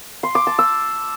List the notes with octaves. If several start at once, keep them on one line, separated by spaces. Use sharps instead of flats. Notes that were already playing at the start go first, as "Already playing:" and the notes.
C6
D6
A5
E6